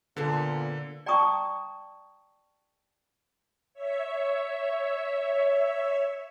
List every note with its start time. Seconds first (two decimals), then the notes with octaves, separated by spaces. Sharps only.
0.16 A#2 D3 B3 A4 C5
1.06 D5 G5 A5 A#5 C#6 D#6
3.74 C#5 E5